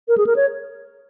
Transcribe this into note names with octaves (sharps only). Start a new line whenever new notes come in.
A#4
G#4
A#4
C#5